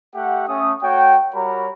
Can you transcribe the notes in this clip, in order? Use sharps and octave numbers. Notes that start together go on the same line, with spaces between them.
A3 G4 E5 F#5
A3 C#4 D#6
A3 F#4 C#5 G5
G3 F#4 A#4 C#5 A#5 B5